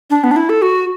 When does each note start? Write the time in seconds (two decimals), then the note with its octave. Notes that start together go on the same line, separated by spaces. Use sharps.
0.10 D4
0.24 B3
0.31 D4
0.36 E4
0.49 A4
0.62 F#4